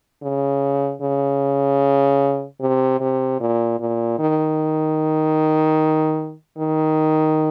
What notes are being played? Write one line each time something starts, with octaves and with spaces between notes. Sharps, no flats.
C#3
C#3
C3
C3
A#2
A#2
D#3
D#3